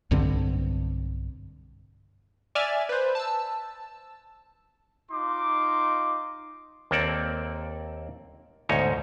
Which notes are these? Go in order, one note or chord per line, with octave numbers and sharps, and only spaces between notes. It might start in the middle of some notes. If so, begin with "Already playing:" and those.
B1 G2 D3 C4
D5 E5 G#5 F6 G#6 A6
B4 C5
A5 E6
D#4 F4 C6 D6
D#2 A#3 C4 A4 D5
D2 G#2 B2 D#4 C#5